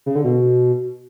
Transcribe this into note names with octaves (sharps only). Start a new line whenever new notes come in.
C#3
D3
B2